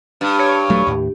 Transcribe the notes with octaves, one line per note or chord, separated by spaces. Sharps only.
G2
C#5
D#1 F#3 A3
D#2 A2